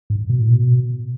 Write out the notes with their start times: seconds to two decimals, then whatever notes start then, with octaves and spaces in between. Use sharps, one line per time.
0.10 G#2
0.30 B2
0.41 A2
0.51 B2